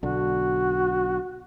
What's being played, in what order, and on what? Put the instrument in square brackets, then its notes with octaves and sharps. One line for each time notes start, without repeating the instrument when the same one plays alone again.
[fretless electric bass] B1 D3 [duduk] F#4